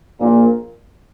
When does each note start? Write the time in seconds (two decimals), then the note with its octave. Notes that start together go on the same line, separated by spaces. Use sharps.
0.20 A#1 A#2